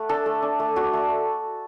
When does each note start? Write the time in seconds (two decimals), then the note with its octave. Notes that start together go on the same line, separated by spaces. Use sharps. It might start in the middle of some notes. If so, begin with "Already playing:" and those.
Already playing: A3 F#5
0.09 D4 A4
0.26 A3
0.42 D4
0.60 A3
0.76 D4 F#4
0.93 A3